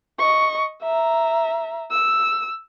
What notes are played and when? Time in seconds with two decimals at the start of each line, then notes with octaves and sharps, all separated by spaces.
0.19 D#5 C#6
0.83 E5 A#5
1.91 E6